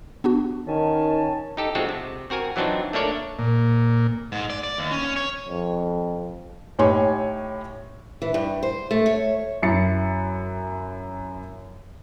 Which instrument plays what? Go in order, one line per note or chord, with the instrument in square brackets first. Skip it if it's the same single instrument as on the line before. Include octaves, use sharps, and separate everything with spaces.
[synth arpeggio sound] B3 D4 F#4
[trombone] D#3 [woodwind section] C#4 G#5 A5
[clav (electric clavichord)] D#4 G4 A4
G#3 C4 D4 F4 F#4 A4
C3
C4 F#4 A#4 G#5
E3 F#3 C4 D4 D#4 F4
A3 A#3 D4 C#5 D5
[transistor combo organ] A#2
[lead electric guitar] G#2
D5
D5
D#2
C#4
C#4
C#5
[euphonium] F2
[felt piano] A2 D#4 G4 C#5 G#5 C6
[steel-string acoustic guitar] E3
G2
C5
A3
C#5
[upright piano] F#2 E4 A6 C#7